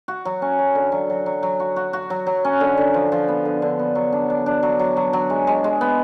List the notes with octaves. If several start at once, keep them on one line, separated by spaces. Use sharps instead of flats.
F#4
F#3
C#4
F#3
D3
F#3
F#3
F#3
F#3
F#4
F#4
F#4
F#3
F#3
C#4
D3
D3
F3
F3
B3
D3
D3
B3
F#3
D4
D4
D4
F#3
F#3
F#3
F#3
G#3
G#3
G#3
B3